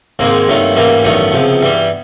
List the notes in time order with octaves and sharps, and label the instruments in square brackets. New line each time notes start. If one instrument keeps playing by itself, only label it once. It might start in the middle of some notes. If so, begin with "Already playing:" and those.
[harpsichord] G#2 D#3 G#3 A#3 C4
G2 D#3 F#3 A3
A1 G#2 E3 G3 A#3
A1 G2 D#3 F#3 A3 B3
C#2 C3 F3
G2 E3 G3